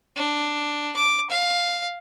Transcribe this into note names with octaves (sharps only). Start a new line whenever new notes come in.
D4
D6
F5